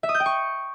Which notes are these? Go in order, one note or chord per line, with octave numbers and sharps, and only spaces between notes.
E5
D#6
G6
G5
C#6